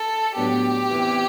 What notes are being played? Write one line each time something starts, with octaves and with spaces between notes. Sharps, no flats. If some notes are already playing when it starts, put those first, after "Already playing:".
Already playing: A4
A2 F#3 B3 D4 G4
E2 C3 E3